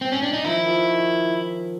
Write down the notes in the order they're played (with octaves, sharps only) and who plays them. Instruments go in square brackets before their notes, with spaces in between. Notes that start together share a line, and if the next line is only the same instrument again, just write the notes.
[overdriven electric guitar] C4
C#4
D4
D#4
[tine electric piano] D#3 F3 [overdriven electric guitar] E4
[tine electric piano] D#3 F3
D#3